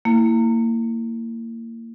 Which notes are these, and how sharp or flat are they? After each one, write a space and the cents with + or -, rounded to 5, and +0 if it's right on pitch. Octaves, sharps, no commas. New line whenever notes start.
A#3 -25 E4 +0